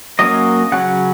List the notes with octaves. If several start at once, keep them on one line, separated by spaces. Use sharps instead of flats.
F#3 A#3 C#4 D#5
C#3 F#3 C#4 F#5